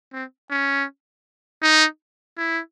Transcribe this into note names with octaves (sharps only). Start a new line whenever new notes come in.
C4
C#4
D#4
E4